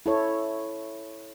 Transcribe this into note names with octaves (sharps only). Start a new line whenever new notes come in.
E4 A4 C#5